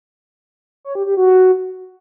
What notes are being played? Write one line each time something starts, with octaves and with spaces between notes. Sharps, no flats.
C#5
G4
G4
F#4